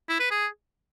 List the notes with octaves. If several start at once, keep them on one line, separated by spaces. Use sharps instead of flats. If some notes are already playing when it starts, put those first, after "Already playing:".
E4
B4
G#4